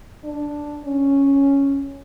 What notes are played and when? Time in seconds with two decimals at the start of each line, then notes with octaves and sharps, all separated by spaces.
0.24 D4
0.85 C#4